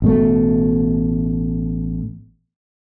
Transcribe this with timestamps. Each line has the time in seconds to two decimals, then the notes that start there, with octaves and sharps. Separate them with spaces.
0.02 A1 B2 A3